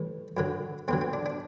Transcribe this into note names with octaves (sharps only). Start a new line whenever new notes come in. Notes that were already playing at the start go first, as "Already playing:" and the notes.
Already playing: A2 E3 G3
F#2 D3 F#3
E2 D3 F#3 C4
C4
D4
D4